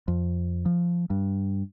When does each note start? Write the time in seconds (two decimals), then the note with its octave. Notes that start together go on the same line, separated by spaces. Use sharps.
0.08 F2
0.65 F3
1.10 G2